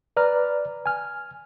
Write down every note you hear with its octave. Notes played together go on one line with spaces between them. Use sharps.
B4 D5 A#5 F6
G#5 F6